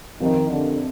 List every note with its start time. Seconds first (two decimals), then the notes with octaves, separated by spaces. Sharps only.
0.19 F2 C3 D#3 F3
0.49 D3